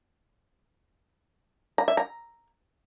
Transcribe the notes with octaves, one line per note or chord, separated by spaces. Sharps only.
A#5
E5
A#5